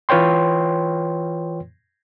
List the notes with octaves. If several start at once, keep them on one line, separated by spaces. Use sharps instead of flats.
E3 F4 B4 C#5 G5 C6